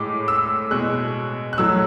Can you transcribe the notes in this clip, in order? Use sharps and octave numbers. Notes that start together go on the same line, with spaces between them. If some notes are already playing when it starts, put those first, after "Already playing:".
Already playing: A2 G#3 D6
E6
B2 G#3 F#6
F#6
A2 F#3 A3 E6